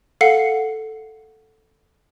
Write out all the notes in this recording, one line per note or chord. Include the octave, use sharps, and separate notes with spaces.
A4 F5 F#5 C7 C#7